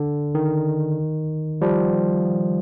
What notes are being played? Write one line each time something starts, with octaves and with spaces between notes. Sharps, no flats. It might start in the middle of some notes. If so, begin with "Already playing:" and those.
Already playing: D3
D#3
F3 G3